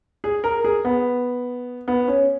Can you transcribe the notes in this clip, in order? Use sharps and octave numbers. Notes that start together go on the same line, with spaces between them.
G#4
A#4
G#4
B3
B3
C#4